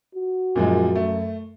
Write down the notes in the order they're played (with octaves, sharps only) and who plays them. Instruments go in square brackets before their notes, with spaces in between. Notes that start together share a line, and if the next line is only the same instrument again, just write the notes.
[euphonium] F#4
[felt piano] F#2 [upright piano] A#2 F3 G#3
[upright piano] A3